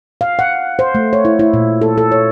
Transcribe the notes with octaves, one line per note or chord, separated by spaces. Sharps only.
F5
F#5
C5
A3
C#5
E4
E4
A#2
A4
A4
C#5